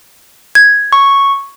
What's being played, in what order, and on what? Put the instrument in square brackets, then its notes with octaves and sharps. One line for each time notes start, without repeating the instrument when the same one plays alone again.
[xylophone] G#6
[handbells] C#6